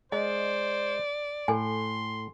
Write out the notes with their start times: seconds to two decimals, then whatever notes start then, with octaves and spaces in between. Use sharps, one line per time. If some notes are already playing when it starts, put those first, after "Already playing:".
0.12 G#3 C5 D5 D#5
1.48 A2 A4 G#5 C6